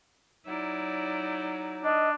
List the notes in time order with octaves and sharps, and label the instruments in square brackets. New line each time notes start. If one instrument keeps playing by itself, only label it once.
[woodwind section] F#3 D#4 [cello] E4 D5
[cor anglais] D4 [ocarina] D#5